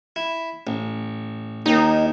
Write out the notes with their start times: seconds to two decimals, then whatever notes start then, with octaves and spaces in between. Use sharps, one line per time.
0.16 E4
0.67 A1
1.66 D#2 D#3 D#4